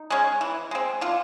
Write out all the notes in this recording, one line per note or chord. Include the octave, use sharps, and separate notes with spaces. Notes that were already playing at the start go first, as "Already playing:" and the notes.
Already playing: D#4
G#3 C#4
E3
G#3 C4
D3 F4